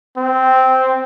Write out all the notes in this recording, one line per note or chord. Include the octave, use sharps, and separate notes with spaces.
C4